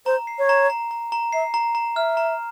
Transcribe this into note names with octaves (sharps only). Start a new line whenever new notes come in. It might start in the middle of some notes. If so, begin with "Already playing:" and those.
C5 A#5
C7
C#5
A#5
A#5
A#5
A#5
E5 C7
A#5
A#5
E5 F6
A#5